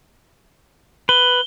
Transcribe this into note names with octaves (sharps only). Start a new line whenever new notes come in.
B4 G7